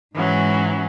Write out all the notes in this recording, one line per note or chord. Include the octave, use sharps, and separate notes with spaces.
G#2 E3 F#3 C#4